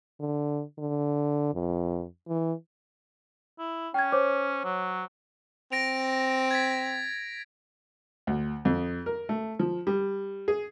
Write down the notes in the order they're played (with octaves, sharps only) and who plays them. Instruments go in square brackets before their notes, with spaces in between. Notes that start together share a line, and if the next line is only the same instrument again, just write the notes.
[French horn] D3
D3
F2
E3
[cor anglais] E4
[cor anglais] C#4 [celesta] G5 G#6
[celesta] C5 C#5 D6
[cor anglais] F#3
[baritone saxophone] C4 [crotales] A#6 D7 F7
[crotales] G#6 A6 B6
[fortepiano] D2
F2
A#4
A3
F3
G3
G#4